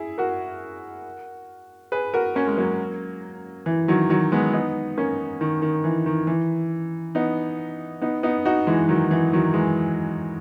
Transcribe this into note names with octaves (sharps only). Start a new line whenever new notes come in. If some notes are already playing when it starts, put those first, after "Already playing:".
Already playing: E4 G#4
F#4 A#4
G#4 B4
F#4 A#4
A#3 C#4
G#3
F#3 A#3
E3
D#3 F#3
D#3 F#3
G#3 B3
B3 D#4
A#3 C#4
D#3
D#3
E3
D#3
E3
B3 D#4
B3 D#4
B3 D#4
D#4 F#4
E3 G#3
D#3 F#3
E3
D#3 F#3
E3 G#3